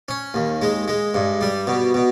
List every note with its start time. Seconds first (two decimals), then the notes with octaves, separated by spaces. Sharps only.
0.09 C#4
0.34 D#2
0.62 G#3
0.88 G#3
1.14 G2
1.41 G3
1.67 B2
1.94 B2